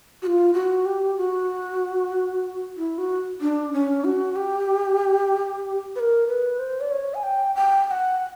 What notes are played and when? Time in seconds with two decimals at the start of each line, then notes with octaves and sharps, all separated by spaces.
0.22 F#4
0.27 F4
0.54 F#4
0.85 G4
1.18 F#4
2.77 E4
2.98 F#4
3.41 D4
3.73 C#4
4.04 F#4
4.36 G4
5.96 B4
6.00 A#4
6.28 B4
6.59 C5
6.81 D5
6.91 C#5
7.14 G#5
7.23 G5
7.55 G5
7.87 G5
7.91 F#5
8.19 F#5